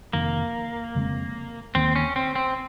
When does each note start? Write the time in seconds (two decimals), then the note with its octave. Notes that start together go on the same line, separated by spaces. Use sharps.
0.13 F1 F2 D#3 A#3
0.95 F2 C#3 G#3 C4
1.75 D#2 D#3 F#3 A#3 C4
1.96 C#4
2.16 C4
2.36 C4